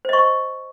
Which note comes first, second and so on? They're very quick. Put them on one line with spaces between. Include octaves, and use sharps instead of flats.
C5 D#5 C#6